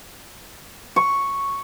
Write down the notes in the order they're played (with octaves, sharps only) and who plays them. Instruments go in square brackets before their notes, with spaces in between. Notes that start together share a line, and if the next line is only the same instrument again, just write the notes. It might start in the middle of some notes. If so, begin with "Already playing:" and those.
[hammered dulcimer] C#6